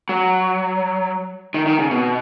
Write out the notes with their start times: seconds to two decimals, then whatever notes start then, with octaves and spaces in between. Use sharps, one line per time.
0.09 F#3
1.54 D#3
1.67 D#3
1.79 C#3
1.91 B2